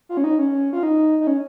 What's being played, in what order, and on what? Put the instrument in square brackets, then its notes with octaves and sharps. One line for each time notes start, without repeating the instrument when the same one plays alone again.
[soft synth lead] F4
C#4
D#4
C#4
F4
D#4
D#4
C#4